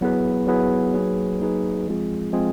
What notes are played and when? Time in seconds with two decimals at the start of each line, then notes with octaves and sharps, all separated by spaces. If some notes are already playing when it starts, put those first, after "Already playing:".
0.01 F#3 B3 E4 G#4 B4
0.47 F#3 B3 E4 G#4 B4
0.94 F#3 A#3 D#4 G#4 B4
1.40 F#3 A#3 D#4 G#4 B4
1.87 F3 G#3 C4 F4 G#4
2.33 F3 G#3 C4 F4 G#4